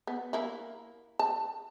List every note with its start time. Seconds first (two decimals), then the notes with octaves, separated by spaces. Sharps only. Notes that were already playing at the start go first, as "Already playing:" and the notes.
0.07 B3
0.33 A#3 E4
1.19 A5